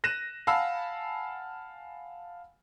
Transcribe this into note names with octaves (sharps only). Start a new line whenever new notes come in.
F#6 A#6 D#7 E7
F5 F#5 G#5 A5 B5 E6